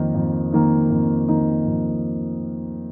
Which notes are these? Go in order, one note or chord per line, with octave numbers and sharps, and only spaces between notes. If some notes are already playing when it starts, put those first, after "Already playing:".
Already playing: F2 D#3 A#3 D#4
F2
D#3 A#3 D#4
F2
D#3 A#3 D#4
F2